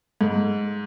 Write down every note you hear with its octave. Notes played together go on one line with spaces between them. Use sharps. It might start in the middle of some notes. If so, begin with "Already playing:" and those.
G#2